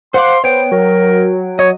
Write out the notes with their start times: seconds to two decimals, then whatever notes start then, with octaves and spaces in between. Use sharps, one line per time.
0.14 C5 F5 F#5 C6 D6
0.44 B3 C5 C#5 G5
0.71 F#3 A#4
1.59 C#5 D#5